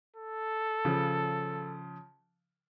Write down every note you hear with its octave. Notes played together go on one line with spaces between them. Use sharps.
A4
C#3 F3